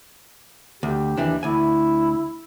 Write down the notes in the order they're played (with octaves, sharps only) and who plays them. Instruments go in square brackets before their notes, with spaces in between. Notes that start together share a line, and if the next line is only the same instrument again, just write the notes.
[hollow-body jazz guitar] D2 [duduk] G4
[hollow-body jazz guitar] D#2 E3 D4
[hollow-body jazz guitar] D2 G#5 [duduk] E4